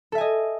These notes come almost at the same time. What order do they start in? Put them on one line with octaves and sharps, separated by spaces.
A4 E5 G#5 D#5